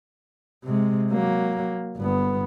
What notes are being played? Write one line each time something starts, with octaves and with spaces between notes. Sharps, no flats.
C3 G#3
F#3 A#3
G1 B3